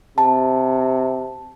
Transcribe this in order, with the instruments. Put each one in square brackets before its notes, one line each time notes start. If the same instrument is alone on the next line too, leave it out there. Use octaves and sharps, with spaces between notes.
[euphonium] C3 [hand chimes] A5